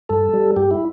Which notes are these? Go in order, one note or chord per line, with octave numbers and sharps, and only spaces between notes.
G2 A4
G3
G2 G4
E4